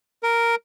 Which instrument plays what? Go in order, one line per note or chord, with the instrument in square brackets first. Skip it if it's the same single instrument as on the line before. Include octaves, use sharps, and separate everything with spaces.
[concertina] A#4